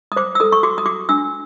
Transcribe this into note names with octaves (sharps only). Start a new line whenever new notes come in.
D#6
C5 D6
E6
A4 D#6
C#6
F#4 D6
D#6
F#4 D6
D4 E6